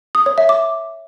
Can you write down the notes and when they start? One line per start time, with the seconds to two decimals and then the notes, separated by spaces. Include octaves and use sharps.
0.15 D#6
0.26 C#5
0.38 E5
0.49 D6